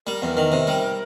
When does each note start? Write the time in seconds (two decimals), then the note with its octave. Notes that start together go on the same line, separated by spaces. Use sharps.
0.06 G3 A#4
0.22 E2
0.37 D#3
0.52 C3
0.67 G3